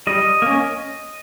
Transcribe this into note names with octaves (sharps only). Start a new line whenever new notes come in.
G3 D#5
A#3 C#4